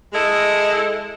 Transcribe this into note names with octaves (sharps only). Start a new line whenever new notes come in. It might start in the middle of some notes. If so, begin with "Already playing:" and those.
G#3 E4 A4 D#5